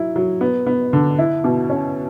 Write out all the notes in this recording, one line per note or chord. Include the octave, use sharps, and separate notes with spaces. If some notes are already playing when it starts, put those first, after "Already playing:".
Already playing: F#3 E4
F#3
B3
B3
D3
E4
B2
C#4